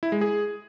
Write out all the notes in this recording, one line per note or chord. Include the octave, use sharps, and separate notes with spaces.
E4
G#3
G#4